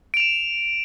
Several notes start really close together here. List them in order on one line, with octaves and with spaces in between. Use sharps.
D7 F7 E7